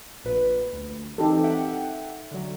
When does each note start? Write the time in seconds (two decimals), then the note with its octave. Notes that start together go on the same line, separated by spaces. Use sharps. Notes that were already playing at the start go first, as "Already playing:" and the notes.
0.25 A#1 A#2 B4
0.73 D2
1.18 E3 C4 D#4 G4 A4
1.44 E5 F#5 G5
2.31 D3 F#3